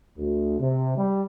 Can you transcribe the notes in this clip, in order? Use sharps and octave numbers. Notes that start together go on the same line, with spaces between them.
D2
C3
G3